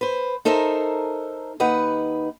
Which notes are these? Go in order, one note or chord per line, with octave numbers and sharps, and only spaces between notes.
B4 C5
D#4 A4 A#4 C5 E5
D#2 D#4 B4 F#5